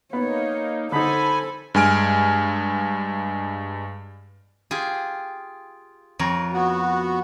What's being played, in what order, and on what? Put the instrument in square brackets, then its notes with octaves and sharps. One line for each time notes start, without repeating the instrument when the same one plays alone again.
[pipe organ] A#3 D#4 [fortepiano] B3 [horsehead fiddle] C#5
[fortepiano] D3 D#4 [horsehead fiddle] A4 C5 [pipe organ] G#5 [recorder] B5
[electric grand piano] G2 G#3 G#5 F6 D7
[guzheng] F4 G4 G#4
F2 A#4 C#5
[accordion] B3 F#4